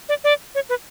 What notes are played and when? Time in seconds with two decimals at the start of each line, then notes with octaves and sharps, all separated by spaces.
0.09 D5
0.24 D5
0.55 C#5
0.69 B4